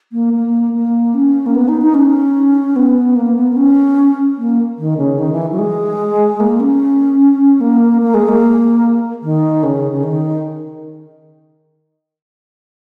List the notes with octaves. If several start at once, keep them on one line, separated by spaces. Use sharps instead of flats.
A#3
A#3
A#3
C#4
A#3
B3
D#4
D#4
C#4
B3
A#3
B3
B3
C#4
A#3
D#3
C#3
D#3
E3
F#3
G#3
A#3
C#4
A#3
A#3
G#3
A#3
D#3
C#3
C#3
D#3